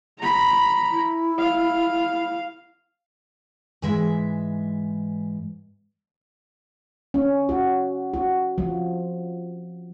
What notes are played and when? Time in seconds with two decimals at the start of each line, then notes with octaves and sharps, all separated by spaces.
0.19 A#5 B5
0.91 E4
1.38 F5
3.82 G#2 E3 G#3 E5
7.14 C#4
7.49 F#4
8.14 F#4
8.58 F3